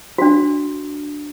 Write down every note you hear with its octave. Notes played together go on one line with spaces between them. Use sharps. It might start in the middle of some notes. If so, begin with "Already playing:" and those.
D4 F#4